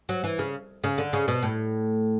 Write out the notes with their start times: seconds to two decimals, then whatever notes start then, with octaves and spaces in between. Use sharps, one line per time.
0.09 F#3
0.24 E3
0.39 C#3
0.84 C#3
0.98 D3
1.13 C#3
1.28 B2
1.43 A2